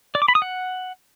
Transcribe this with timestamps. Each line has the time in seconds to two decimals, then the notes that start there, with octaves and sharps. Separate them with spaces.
0.15 D5
0.22 D6
0.28 B5
0.35 D#6
0.42 F#5